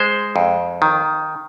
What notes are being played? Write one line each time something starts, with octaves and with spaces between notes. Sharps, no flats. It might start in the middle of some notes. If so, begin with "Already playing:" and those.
Already playing: G#3 C5
F2
D#3